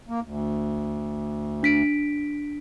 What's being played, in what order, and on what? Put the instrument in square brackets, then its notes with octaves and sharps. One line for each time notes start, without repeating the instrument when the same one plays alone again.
[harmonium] A#3
D2
[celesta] D4 B6 D7